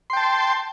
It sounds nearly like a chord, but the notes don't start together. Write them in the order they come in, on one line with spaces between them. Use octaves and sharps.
C6 G5 A5